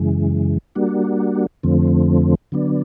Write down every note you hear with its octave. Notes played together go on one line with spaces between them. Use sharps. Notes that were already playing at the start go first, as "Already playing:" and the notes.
Already playing: F#2 C#3 E3 G#3
G3 A#3 D4 F#4
F2 D3 F3 A3 C4
D3 F#3 B3 D4